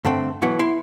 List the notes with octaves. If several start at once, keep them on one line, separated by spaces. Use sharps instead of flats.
G2 D3 A3 C4
B1 B2 E3 F#3 B3
E4 C6